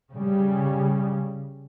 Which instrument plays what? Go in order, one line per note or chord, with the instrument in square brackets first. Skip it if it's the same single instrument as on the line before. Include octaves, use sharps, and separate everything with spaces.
[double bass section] C#3 G3